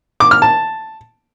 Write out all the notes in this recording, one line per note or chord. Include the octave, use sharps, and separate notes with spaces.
D6
F6
A5